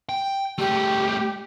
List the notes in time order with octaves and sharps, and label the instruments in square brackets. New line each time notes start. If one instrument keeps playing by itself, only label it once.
[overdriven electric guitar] G5
[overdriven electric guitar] G3 A3 [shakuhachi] G4